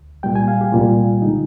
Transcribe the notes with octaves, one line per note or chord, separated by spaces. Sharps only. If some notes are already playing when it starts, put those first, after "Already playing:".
Already playing: D2
C2 A#2 G3 G5
G#5
F5
G4
C2 A#2 G3 F4
D3 G#3 D#4